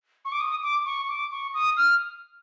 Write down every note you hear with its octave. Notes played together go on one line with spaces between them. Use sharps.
C#6
D6
D#6
D6
C#6
D6
C#6
D#6
F6